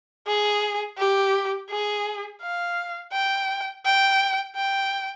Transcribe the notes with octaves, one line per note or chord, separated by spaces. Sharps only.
G#4
G4
G#4
F5
G5
G5
G5